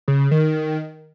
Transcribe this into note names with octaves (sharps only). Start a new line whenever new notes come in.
C#3
C#3
D#3